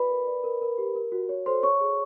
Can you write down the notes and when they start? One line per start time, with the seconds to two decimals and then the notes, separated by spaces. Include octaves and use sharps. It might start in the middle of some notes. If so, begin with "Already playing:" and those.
Already playing: F#4 B4 D5 B5
0.10 A#4
0.27 D5
0.44 A#4
0.61 A#4
0.78 G4
0.95 A#4
1.12 F#4
1.29 C#5
1.46 A4 C5 C6
1.63 C#5 C#6
1.80 G#4